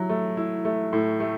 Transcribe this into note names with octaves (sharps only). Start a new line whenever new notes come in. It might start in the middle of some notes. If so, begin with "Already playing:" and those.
Already playing: F#3 E4
A3
E4
A3
A2
A3